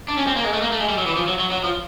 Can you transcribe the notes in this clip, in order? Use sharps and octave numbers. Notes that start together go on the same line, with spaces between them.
D4
C#4
C4
A#3
G#3
A3
A#3
A3
G#3
G3
F#3
E3
F3
F#3
F#3
F#3
F3